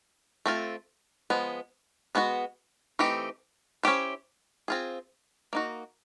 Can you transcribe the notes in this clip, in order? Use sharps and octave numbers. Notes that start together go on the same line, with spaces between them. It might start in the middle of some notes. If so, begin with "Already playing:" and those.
A3 C4 F4
F3 G#3 B3
G#3 B3 D4 F#4
E3 A3 C4 D#4 G4
C#4 E4 G4 C5
C4 F4 G#4
A#3 D#4 F#4